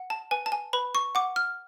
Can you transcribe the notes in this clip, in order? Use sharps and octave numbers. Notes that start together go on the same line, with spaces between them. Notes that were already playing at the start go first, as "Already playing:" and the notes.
Already playing: F#5
A5
B4 G#5
A5
G#5
B4 B5
C#6
F#5 D6
F6